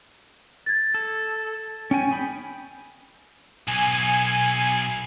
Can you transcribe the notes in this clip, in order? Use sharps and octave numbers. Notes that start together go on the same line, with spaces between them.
G#6 A6
A4
C#4 G5 G#5
G#4 G5 B5
B1 G#5